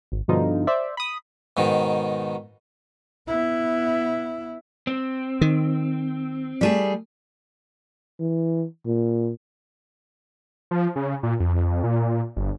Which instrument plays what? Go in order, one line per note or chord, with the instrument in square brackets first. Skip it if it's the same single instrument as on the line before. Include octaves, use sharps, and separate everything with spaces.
[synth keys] G#1
G2 B2 D3 F3 D#4 F4
C5 D5 E5
B5 D#6
[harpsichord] G#2 B2 D#3
[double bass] B3 E4
[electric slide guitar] C4
[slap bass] D#3
[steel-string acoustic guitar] G3 A3 G#4
[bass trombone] E3
A#2
[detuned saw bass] F3
C#3
A#2
F2
A#2
G1